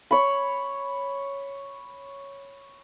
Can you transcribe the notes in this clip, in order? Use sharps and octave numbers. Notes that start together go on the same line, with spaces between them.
C#5 B5